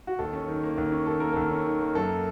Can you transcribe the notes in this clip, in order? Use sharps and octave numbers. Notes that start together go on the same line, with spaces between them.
F#4
D#2 A4
C#4
D#3
A#3
D#2
C#4
D#3 A4
A#3 A#4
D#2 A4
C#4
D#3
A#3
F#2 A4